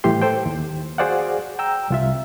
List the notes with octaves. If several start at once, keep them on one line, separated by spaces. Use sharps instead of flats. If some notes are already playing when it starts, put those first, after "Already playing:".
A2 E3 G3 G4 C6
A4 C5 G5
D#2
F#4 G#4 C5 D5 F5 F#5
G5 A#5 E6
C2 F4 E5